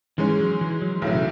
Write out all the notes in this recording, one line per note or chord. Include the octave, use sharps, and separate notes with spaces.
G#2 E3 G#3 C#4
F#3
E3
F#3
B1 A2 E3 F#3
C#3